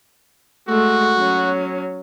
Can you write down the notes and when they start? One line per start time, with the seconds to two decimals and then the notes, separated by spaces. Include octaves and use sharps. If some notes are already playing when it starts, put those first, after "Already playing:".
0.68 G#3 A3 F#4
1.15 F#3 C#4